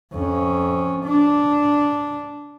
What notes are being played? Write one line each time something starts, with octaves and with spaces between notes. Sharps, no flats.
F2 C#4
D4